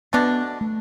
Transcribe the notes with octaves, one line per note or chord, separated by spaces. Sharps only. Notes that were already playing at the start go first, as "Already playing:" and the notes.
B2 A3 B3 D4
A3